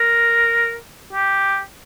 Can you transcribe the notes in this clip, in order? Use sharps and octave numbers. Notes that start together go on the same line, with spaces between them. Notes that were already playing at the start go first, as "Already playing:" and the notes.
Already playing: A#4
G4